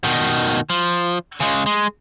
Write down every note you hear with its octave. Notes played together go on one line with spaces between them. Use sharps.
B2 D#3
F3
C#3 G#3
G#3